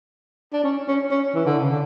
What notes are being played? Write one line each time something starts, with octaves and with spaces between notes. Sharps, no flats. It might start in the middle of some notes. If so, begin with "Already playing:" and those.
D4
C#4
C#4
C#4
E3
D3
C#3
D3